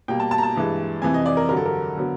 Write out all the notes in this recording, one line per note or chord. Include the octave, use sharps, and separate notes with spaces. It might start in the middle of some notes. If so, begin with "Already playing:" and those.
B2 G3 A#3 G5
A5
A5
A#5
A5
G2 E3 G#3
F2 C3 E3 G#5
D#5
D5
A#4
G2 D3 F#3 A#4
A4
A#4
D3 F#3 B3